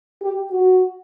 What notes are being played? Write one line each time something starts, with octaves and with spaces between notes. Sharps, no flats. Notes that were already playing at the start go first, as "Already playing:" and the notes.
G4
F#4